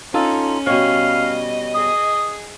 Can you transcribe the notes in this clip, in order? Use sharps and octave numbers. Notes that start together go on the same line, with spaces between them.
C#4 D#4 F4 A4
B2 G3 C#5 D#5 F5
G#4 D#6